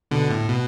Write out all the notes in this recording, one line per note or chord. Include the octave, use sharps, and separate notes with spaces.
B2 D3
A2
B2